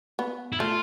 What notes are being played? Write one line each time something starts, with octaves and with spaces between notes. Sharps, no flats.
B3
E4
A3 F4